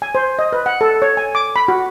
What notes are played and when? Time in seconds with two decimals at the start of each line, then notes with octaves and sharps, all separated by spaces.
0.02 G#5
0.15 C5
0.39 D#5
0.53 B4
0.66 F#5
0.81 A4
1.02 C#5
1.17 G#5
1.35 D6
1.56 B5
1.68 F#4